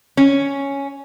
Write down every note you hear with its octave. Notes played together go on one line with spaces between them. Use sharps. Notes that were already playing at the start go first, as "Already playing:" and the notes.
C#4